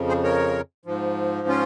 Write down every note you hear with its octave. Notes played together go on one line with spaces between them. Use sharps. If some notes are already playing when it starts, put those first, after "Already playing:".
Already playing: F2 C#3 F3
G#4 C5
A#4 C#5
G#2 F3
C#4 F4